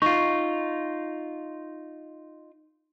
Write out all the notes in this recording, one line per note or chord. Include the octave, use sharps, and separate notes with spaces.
D#4 F4 C#6